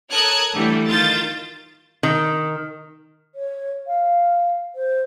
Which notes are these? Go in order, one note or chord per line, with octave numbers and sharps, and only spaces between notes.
A4 A#4 C#5 D#6 F#6 G#6
D3 E3 G3 A3
D#3 F4 G6 A6
D#3
C#5
F5
C5